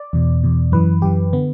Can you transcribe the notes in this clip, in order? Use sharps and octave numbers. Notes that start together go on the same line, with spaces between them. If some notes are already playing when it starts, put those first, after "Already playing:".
Already playing: D5
E2 B2
E2 B2
F#2 E3 B4
F#2 E3 G4
D3 B3